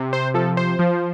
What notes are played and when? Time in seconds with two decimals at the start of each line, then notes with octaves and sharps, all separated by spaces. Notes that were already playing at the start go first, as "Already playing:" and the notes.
Already playing: C3
0.13 C5
0.34 F3 A4
0.57 C5
0.79 F3